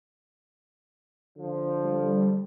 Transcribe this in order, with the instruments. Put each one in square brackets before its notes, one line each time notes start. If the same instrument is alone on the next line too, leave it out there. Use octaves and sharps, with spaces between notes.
[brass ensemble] D3 F3
[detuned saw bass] G3